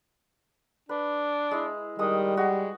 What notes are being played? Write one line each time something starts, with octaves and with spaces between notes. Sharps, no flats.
D4 B4
G#3 E4
D#3 G3 G#3 D#6
G#3 F#4